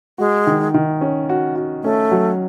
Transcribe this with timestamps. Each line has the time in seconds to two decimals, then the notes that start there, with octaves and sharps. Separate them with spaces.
0.18 G#3 F#4
0.47 D#3
0.74 D#3
1.01 C#4
1.29 F#4
1.56 F#4
1.83 A3 C#4
2.11 F#3